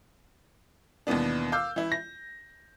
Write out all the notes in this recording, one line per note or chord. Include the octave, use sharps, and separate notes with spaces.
D#2 B2 E3 B3 D4
F5 D6 E6 F6 G6
E3 E4
A#6